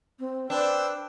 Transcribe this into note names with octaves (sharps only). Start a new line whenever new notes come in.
C4
D4 B4 C5 G5 E6